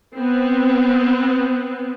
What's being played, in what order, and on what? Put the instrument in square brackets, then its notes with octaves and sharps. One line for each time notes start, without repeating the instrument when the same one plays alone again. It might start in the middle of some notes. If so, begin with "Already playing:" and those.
[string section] B3 C4